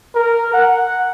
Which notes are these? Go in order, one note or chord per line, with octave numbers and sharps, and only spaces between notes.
A#4
F#5